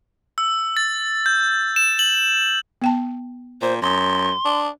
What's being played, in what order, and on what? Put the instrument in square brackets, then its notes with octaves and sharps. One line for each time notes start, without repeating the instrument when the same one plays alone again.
[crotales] E6
A6
G6
E7
F#7
[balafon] B3 G5 A5
[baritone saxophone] A#2 [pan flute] C5
[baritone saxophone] F#2 [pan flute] C6
[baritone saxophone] D4